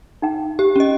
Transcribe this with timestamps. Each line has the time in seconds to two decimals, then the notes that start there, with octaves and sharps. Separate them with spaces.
0.22 D#4 G5
0.59 G4
0.76 C#4 D#5